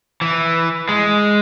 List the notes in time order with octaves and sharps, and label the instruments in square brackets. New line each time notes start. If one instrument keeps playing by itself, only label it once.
[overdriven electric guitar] E3
G#3